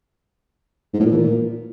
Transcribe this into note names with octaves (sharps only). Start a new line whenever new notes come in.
G#2
A2
A#2
E3
A#2